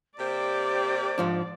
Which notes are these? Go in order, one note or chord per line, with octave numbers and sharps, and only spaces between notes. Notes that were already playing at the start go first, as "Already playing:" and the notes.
C3 A#3 G4 C5 D5
G#2 F3 D4